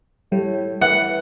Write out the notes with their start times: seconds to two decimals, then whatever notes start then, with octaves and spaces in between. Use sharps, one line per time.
0.32 A2 G3
0.81 E3 E5 F#5